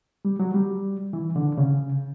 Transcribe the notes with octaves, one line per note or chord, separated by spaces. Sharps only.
G3
F#3
G3
E3
D3
C#3